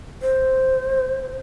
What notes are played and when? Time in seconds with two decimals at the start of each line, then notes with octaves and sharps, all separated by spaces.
0.22 C5